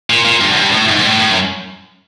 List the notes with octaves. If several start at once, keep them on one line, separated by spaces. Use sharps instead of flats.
A#2
A#2
G2
F#2
G2
A2
G#2
G#2
A2
A2
F#2